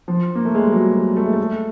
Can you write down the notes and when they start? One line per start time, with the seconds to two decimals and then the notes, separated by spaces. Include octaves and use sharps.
0.08 F3
0.35 A#3
0.45 A3
0.55 G#3
0.63 G3
0.73 F#3
0.95 G3
1.16 A3
1.25 G#3
1.33 A3